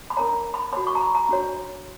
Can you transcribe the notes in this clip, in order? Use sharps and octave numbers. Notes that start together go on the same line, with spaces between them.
B5
D4 A#4 C#5 A#5
B5
F#4 C#5 B5
C#6
A#5
B5
A#5
D4 F#4 C#5